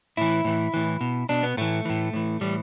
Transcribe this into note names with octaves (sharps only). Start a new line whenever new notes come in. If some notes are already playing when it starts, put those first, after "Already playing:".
A2 E3 E4
A2 E3
A2 E3
B2
B2 D4
B3
A2 E3 A3
A2 E3
A2 E3
A2 E3 G3